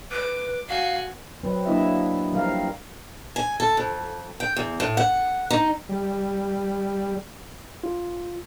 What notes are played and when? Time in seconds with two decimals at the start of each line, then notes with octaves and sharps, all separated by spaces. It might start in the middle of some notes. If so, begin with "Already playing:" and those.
0.11 B4 D6
0.69 F#4 F5 G#5
1.43 F#3 C4 B4
1.66 F#3 A#3 D4 E4 D#5 E5
2.33 F3 G3 C4 A#4 F5
3.36 G#5
3.60 A4
3.77 F2
4.40 G5
4.57 E2
4.80 A2
4.97 F#5
5.50 D#4
5.89 G3
7.84 F4